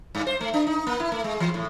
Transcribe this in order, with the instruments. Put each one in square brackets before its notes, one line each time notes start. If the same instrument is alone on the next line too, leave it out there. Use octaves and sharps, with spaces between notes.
[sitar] G2
C5
A3
D4
D#4
A#3
E4
A3
G#3
E3
A2